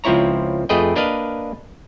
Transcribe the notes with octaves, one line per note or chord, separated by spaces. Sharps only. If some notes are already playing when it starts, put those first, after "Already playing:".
C#2 F3 C4 E4 C#5 A#5
F2 A3 G#4 B4 D#5 G5
A#3 D4 B4 D#5 F5